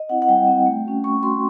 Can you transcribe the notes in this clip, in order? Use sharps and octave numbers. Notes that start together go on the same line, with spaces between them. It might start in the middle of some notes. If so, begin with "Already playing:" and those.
Already playing: D#5
C4 E4 F#5
F#5
G3 G5
C4 E4
A3
C#4 F#4
A3 C#6
C#4 F#4 C6